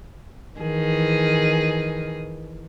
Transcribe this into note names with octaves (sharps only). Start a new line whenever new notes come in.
D#3 E3 G#4